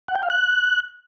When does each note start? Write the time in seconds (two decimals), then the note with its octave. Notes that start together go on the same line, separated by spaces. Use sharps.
0.08 F#5
0.16 G5
0.23 F5
0.30 F#6